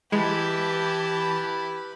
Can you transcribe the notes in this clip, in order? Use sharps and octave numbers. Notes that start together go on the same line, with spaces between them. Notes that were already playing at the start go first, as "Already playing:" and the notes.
E3 G#3 E4 G4 B4 A5 B5